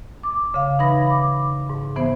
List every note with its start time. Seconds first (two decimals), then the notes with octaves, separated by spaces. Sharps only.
0.23 D6
0.54 C#3 F5
0.79 E3 D#4 B4 B5 A#6
1.06 B5 D6
1.69 G#2
1.96 E3 B3 C5